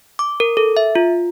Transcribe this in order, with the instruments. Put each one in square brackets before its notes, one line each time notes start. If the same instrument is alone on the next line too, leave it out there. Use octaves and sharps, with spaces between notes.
[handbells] D6
A#4
A4
E5
F4